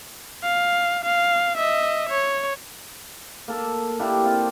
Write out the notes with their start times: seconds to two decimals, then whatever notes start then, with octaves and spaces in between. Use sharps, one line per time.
0.43 F5
1.05 F5
1.58 D#5 E5
2.09 C#5
3.48 A#3 A4
3.99 A#3 D4 E4 G4
4.23 C3 F4